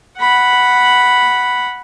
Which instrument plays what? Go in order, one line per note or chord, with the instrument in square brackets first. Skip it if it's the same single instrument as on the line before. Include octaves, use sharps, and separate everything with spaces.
[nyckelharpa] F#5 B5